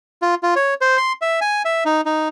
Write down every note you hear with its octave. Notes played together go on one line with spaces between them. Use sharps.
F4
F4
C#5
C5
C6
E5
G#5
E5
D#4
D#4